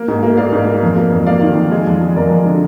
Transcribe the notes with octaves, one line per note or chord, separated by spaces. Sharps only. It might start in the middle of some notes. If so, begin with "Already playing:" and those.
Already playing: A#3
G#2
A#3
A#3 D5 F5
G#2
A#3
F2
A#3
F2
A#3 D5 F5
D#3
F2
G#3
F2
F2
F2 A#4 D5
F2
D3